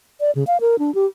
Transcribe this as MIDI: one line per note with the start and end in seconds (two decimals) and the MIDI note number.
0.20 0.31 74
0.35 0.44 49
0.47 0.57 77
0.61 0.79 70
0.79 0.93 62
0.95 1.06 67